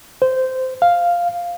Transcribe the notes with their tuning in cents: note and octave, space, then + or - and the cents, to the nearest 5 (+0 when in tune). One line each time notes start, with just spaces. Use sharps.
C5 -15
F5 +0